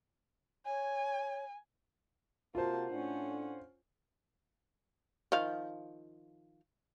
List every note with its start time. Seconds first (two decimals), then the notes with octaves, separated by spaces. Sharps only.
0.66 C#5 G#5
2.55 C3 A#3 F4 F#4 C5 A5
2.90 A2 C#4 D4 F#5
5.32 D#3 F3 F5